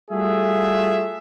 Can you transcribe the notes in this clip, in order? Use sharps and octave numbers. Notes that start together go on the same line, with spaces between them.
G3 A3 F4 F#4 G#4 E5